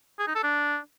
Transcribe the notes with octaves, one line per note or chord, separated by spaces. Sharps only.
G#4
D#4
A4
D4